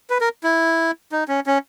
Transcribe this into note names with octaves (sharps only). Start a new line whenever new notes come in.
B4
A#4
E4
D#4
C#4
C#4